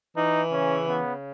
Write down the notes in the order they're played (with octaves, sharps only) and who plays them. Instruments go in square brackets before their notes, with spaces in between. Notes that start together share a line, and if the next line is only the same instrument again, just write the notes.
[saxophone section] E3 [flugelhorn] D#4
[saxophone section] C#3 [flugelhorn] C#4
[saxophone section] C#3 [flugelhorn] B3